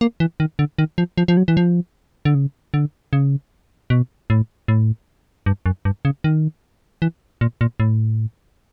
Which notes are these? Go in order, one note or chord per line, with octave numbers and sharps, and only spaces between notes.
A#3
E3
D#3
D3
D#3
F3
F3
F3
F#3
E3
F3
D3
C#3
D3
C#3
B2
A2
A2
G2
F#2
G2
C#3
D#3
E3
A#2
A#2
A2